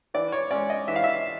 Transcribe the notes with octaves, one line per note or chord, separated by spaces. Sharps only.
E3 D5
C#5
G#3 C#4 D5
D#5
E3 E5
F5
E5